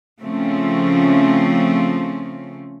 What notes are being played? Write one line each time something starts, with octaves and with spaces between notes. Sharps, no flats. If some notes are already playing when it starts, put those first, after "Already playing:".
C#3 F3 A3 C4 C#4